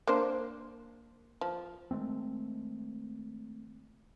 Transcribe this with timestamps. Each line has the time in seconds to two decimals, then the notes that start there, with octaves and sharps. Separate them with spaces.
0.07 A#3 D4 C5
1.41 F3
1.91 D#3 G#3 A3 C4